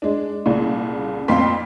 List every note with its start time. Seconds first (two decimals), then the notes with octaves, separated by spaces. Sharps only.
0.02 G#3 D4
0.46 C2 A#2 C#3
1.28 F2 A#2 C4 F5 C6 B6